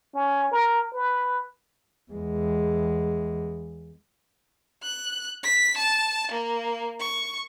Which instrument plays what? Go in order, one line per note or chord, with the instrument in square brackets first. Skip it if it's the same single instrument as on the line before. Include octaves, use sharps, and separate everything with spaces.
[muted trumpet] C#4
A#4
B4
[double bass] E2 G#3
[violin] F#6
B6
A5
A#3
C#6